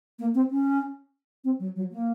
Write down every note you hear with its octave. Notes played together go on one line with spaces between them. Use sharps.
A#3
C4
C#4
C4
F#3
F#3
A#3